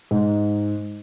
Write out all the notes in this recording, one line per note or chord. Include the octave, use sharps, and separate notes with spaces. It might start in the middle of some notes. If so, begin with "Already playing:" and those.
G#2